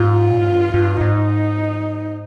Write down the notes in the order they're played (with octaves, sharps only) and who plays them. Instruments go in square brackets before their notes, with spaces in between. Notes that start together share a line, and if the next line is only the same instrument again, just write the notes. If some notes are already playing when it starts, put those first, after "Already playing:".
Already playing: [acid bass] G#2 [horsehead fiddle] F4
[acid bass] A#2
G#2
G2
G2
[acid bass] G#2 [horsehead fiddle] D#4